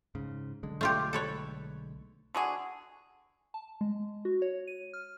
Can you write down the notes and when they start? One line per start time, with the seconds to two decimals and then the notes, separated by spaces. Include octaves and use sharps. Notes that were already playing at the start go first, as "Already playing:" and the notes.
0.15 G#2 C#3
0.63 B1 D3 G#3
0.81 A3 F4 G4
1.13 A4 B4 C#5
2.35 D3 F#4 G#4
3.54 A5
3.81 G#3
4.25 F#4
4.42 C#5
4.67 D#7
4.93 F6